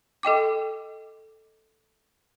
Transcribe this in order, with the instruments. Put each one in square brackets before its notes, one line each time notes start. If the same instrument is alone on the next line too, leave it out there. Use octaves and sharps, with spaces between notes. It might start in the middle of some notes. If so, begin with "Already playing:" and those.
[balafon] A4 D#5 G5 D6